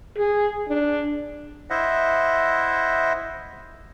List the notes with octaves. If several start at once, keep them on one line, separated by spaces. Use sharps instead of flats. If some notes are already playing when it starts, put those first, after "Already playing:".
G#4
D4
E4 C5 D#5 E5 F#5